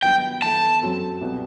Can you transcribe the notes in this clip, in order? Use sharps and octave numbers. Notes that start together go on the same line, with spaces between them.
G2 D#3 F#3 B3 D#4 G5
E3 B3 E4 A4 A5
F#2 F#3 C4 F#4 A4
C2 B2 G3